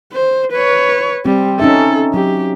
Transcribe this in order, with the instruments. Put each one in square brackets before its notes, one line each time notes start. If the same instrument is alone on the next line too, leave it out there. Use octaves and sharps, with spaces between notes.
[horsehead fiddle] C5
B4 C#5
[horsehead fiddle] G3 [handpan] C4
[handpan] C#4 D#4 E5 [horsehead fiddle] A4
[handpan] F#3 [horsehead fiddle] G4